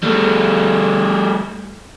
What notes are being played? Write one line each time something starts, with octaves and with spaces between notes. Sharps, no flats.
G3 A3